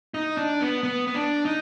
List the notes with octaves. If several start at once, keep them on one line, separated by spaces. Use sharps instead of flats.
D#4
D4
B3
B3
B3
D4
D#4